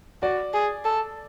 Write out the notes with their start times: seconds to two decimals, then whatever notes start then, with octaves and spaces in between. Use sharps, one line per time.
0.22 F#4 D5
0.53 G#4
0.85 A4